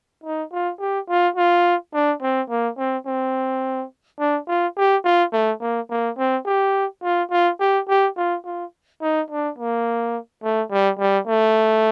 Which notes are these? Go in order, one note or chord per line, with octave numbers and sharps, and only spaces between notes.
D#4
F4
G4
F4
F4
D4
C4
A#3
C4
C4
D4
F4
G4
F4
A3
A#3
A#3
C4
G4
F4
F4
G4
G4
F4
F4
D#4
D4
A#3
A3
G3
G3
A3